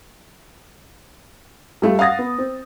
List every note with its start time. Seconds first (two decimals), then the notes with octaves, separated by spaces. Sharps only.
1.82 G3 A3 F4 A4
1.99 F5 F#5 D#6 A6 A#6
2.19 B3
2.38 C4